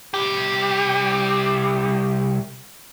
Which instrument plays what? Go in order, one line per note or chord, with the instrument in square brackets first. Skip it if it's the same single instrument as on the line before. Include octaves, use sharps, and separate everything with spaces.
[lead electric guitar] C2 G4